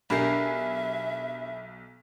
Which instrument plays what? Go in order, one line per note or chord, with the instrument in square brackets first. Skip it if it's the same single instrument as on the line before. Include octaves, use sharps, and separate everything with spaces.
[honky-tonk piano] B1 G#5 C7 [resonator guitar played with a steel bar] D4 G4 A#4 [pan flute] E5 [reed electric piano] B5